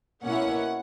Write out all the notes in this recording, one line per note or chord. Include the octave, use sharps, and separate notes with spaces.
B2 A#3 C#4 E4 F#5